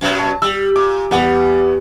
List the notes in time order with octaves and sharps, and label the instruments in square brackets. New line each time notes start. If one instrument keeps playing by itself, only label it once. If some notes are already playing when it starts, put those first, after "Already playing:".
[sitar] F#2 B2 F#3
[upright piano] A5
[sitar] G3 [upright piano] E6 F#7
[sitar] A#2 [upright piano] D6
[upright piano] E2 B3 [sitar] G3